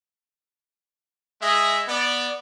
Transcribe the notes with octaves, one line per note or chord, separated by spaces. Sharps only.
G#3 G#4 D#5 E5
B3 D5